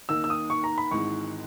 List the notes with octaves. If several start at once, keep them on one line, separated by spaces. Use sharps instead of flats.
D#2 D#3 A#3 D#4 E6
E6
D#6
C#6
A#5
B5
G#1 G#2 E3 G#3 C#6